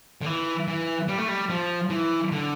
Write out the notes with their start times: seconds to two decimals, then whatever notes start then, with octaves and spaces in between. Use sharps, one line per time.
0.21 D3
0.26 E3
0.68 E3
1.08 G3
1.18 A3
1.28 G3
1.50 F3
1.90 E3
2.32 D3